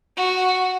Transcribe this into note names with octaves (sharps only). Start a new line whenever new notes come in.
F#4